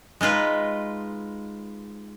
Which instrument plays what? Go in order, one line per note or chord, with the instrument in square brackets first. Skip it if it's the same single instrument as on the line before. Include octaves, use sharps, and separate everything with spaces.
[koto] G#3 D#4 F4 B4